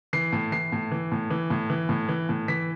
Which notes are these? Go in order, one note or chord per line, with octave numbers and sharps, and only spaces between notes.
E3 C7
A2
E3 C7
A2
E3
A2
E3
A2
E3
A2
E3
A2
E3 B6